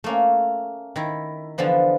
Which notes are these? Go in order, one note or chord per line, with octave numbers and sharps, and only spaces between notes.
A3 A#3 C#4
D#3 E4
D3 E3 F3 B3